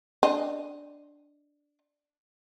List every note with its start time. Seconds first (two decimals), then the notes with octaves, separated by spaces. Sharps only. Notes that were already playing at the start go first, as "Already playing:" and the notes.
0.23 D4 D#5